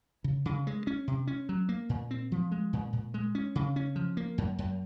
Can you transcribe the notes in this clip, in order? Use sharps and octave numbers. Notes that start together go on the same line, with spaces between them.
C#3
C#3
G#3
C#4
C3
C#4
F#3
A#3
A#2
C4
F3
G#3
A#2
A#2
G#3
C#4
C#3
C#4
F3
A#3
F#2
F#2